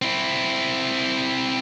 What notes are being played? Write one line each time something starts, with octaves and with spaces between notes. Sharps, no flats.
C4 E4